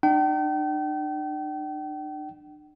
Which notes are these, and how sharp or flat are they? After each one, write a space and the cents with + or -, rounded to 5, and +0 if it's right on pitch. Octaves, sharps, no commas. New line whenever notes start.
D4 +40 G5 -40